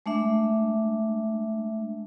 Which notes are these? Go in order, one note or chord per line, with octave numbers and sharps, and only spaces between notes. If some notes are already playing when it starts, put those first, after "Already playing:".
G#3 A3 D4 E5